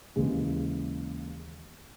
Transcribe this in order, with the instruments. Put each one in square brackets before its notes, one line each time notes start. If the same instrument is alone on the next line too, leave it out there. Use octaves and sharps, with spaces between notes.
[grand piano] D#2 C#3 E3 G#3